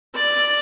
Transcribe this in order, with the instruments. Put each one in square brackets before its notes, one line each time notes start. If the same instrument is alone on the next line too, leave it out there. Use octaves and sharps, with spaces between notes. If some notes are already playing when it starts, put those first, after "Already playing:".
[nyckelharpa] D5